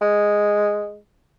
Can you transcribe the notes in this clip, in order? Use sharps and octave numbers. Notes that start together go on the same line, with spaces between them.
G#3